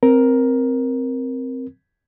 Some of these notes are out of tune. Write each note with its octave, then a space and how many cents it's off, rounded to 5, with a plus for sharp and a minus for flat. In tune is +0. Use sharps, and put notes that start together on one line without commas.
C4 +0 A#4 +10